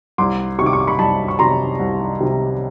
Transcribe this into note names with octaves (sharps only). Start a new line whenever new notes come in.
C2 C6 D6
C3 D#3 C#6 D6
C#6
D6
B5 C#6
C2 A5 B5
C#6
C3 D#3 A#5 C6
C2
C3 D#3